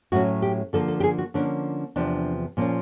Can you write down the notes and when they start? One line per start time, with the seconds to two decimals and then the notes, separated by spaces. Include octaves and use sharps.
0.12 A2 F#3 A3 C#4 F#4
0.42 G4
0.73 D3 F3 A#3 A4
0.88 A4
1.00 G4
1.04 G#4
1.18 F#4
1.34 D3 F3 A#3 C#4 D4
1.96 E2 C3 F3 D4
2.57 A#2 F3 A#3 C#4